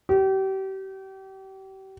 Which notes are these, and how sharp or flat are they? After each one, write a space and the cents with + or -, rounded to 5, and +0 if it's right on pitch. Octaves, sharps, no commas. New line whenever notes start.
G4 -35